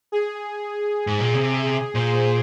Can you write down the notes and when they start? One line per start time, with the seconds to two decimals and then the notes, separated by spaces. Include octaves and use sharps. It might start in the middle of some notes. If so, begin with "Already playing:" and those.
0.12 G#4
1.07 G#2
1.20 A#2
1.34 C3 G#4
1.65 G#4
1.95 A#2 C5